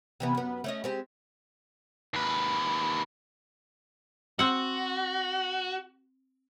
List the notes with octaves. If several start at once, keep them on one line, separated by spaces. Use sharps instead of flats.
C3 E3 B3
F#2 B3
A3 C#4 D#5
G#3 C4 G4
D#2 B4
C4 F#4 F#5